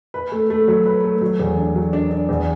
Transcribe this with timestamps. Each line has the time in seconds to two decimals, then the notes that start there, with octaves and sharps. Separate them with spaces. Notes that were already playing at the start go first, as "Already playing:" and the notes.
0.14 B4
0.32 A3
0.50 A3
0.68 F#3
0.86 B4
1.04 A3
1.22 F#3
1.40 E2
1.57 D4
1.75 F#3
1.93 D4
2.11 D4
2.29 E2